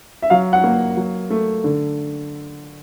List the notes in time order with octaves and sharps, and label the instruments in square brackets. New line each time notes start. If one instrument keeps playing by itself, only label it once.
[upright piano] E5
F#3 F5
F#5
A#3
F#3
A3
D3